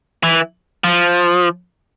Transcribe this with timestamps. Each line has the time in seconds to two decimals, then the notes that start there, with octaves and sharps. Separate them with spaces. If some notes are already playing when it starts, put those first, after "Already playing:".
0.24 E3
0.84 F3